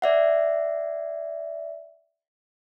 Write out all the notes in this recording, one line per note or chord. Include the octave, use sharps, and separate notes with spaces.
D5 E5 F#5